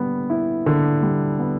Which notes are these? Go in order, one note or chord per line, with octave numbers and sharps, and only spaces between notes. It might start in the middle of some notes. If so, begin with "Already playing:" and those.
Already playing: D3 G3 B3
E4
D3
G3
B3